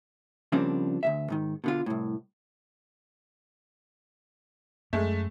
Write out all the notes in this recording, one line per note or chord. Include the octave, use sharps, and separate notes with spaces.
C#3 F3 G3 A#3 C4 D4
D2 G#2 E5
G#2 D#3
B2 D3 F4
C2 A2
F#2 G#3 A3